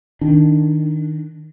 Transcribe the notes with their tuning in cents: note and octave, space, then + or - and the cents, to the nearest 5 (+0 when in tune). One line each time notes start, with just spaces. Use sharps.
D#3 +0 D4 +0